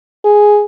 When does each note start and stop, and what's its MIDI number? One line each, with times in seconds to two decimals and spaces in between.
0.24 0.65 68